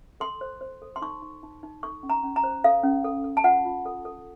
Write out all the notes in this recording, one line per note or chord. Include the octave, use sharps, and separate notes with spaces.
A4 C6
C5
C5
A4
C6
D#4 C#6
D#4
D#4
D#4
A4 C#6
C#4
A#5
C#4
A#5
C5
A4 F5
C#4
A4
A4
A5
F4 F#5
F4
A4
A4